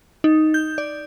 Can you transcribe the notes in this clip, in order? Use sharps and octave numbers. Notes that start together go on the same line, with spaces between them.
D#4
G6
D5